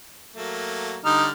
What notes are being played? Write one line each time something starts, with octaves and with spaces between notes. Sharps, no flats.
F#3 A3 A#3
D3 G3 D#4 F6